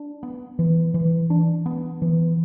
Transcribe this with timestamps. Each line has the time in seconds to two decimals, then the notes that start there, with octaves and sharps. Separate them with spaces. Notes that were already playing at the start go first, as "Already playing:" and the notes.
Already playing: D4
0.23 B3
0.59 E3
0.94 E3
1.30 D4
1.66 B3
2.02 E3